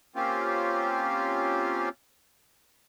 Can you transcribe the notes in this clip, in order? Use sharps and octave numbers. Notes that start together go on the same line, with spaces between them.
A#3 C4 C#4 F4 G4